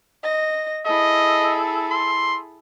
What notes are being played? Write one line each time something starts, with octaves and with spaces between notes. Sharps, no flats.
D#5 A#6
E4 G#4 A4 D#5
C6